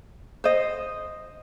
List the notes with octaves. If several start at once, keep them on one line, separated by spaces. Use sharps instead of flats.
C5 D#5